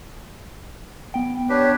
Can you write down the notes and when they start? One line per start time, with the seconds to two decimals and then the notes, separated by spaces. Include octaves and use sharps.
1.14 B3 G5
1.49 D4 G4 B4 C#5